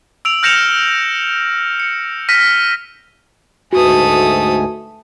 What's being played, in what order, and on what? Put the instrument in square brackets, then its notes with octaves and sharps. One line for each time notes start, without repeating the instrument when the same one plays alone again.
[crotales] E6 D7 F7
F6 G6 A#6 C#7 E7 F7
C#7
F6 A#6 B6 D#7
[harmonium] D2 G#2 G#5 [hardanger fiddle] A3 D#6 [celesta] F#4 B4